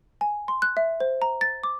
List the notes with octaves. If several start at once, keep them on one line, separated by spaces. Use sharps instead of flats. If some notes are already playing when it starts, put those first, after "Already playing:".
G#5
C6
F#6
E5
C5
A#5
A6
D6